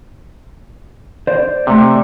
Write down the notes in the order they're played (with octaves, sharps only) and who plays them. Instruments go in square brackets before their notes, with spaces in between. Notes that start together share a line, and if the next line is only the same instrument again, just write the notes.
[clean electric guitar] C5 D5
[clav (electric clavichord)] C3 [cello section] A3